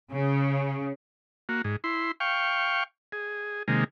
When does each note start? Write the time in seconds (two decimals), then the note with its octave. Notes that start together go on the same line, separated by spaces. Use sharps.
0.11 C#3
1.49 A#3 F#4
1.64 G#2
1.84 E4 C6
2.20 F5 G5 C#6
3.12 G#4
3.68 C3 D#3 G#3 A#3